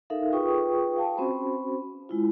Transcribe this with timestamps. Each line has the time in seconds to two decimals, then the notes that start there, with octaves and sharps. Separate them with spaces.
0.10 D#4 A4 A#4 E5 F5
0.33 F4 G#4 B4 G5 C#6 D#6
0.96 F5 G5 A5
1.17 C4 C#4 F#4 C5 B5
2.09 G#3 E4 F4